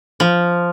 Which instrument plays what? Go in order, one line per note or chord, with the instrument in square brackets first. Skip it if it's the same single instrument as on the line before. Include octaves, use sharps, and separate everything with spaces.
[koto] F3